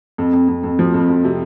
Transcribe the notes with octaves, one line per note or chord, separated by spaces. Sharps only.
F2
F2
F2
F2
F3
F2
F2
C3